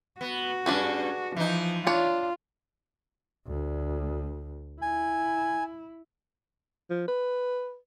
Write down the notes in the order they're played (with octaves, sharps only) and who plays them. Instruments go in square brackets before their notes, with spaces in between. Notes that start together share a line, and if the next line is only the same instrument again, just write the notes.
[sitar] B3 [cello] F#4
[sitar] G2 C#4 [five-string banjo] D4 G#4 B4
[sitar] E3 D#4 [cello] F3
[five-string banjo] D4 C#5 [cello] F4
[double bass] D2
[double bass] E4 [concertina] G#5
[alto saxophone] F3
B4